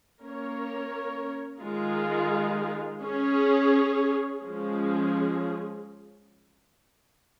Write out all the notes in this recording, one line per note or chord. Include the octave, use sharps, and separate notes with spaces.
A#3 C#4 A#4 C#5
D#3 G#3 F4 G#4
C#4 G#4 C#5
F3 G#3 C#4 G#4